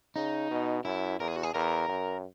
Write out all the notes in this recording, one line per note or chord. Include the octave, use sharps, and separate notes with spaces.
C#3 D#4
B2
F#2 E4
E2 A#4
G#4
F#4
G#4
E2 A#4
F#2